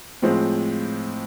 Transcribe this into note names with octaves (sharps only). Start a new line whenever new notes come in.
A2 F3 G#3 C4